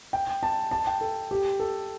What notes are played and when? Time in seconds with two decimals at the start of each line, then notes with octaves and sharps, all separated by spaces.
0.13 G5
0.43 A5
0.71 A5
0.87 G5
1.01 A4
1.31 G4
1.60 A4